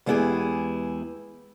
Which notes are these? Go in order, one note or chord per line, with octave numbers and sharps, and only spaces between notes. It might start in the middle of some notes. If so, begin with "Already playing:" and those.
E2 G#3 B3 E4 G4 G#4